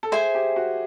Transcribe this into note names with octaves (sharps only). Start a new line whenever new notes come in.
A4
G#4 C5 E5 G#5
G4
F#4